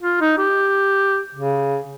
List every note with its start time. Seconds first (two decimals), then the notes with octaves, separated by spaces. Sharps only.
0.02 F4
0.21 D#4
0.38 G4
1.35 C#3